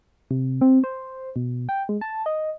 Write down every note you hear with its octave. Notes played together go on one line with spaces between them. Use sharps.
C3
C4
C5
B2
G5
G#3
A5
D#5